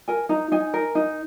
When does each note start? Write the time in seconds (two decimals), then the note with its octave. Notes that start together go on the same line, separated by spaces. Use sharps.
0.08 A#4 G#5
0.29 D#4 A#5
0.52 D#4 G#5
0.74 A#4
0.95 D#4